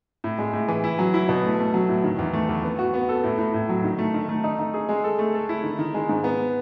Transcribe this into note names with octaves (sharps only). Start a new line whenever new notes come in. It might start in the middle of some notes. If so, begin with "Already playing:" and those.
A2
G#3
A2
E3
E4
F#3
E4
B2
A3
A3
F#3
A2
D#3
E2
A3
E2
B3
F#4
B3
A4
A2
A2
A2
F#3
D#3
A3
D#3
A3
D#4
D#4
G#4
G#3
A4
A3
A4
E4
D#3
D#3
G#3
G#2
B3